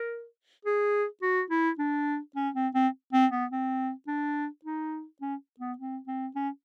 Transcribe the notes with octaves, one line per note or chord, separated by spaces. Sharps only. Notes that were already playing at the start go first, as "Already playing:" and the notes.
Already playing: A#4
G#4
F#4
E4
D4
C#4
C4
C4
C4
B3
C4
D4
D#4
C#4
B3
C4
C4
C#4